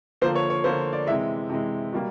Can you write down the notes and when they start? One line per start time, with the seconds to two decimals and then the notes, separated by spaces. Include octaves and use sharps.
0.21 D3 F3 A#3 C5
0.35 C#5
0.50 C#5
0.64 D3 F3 A#3 C5
0.93 D5
1.07 C3 E3 G#3 E5
1.50 C3 E3 G#3
1.93 B2 G3 A#3